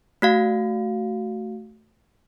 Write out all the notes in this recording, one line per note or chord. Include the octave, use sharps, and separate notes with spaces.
A3 F#4 F5